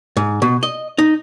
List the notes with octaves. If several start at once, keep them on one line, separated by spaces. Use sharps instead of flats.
G#2
B2
D#5
D#4